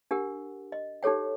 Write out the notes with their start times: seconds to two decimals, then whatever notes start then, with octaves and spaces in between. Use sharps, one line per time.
0.11 D4 G4 A#4 F#5
0.72 D#5
1.03 D#4 G4 A4 C#5 G5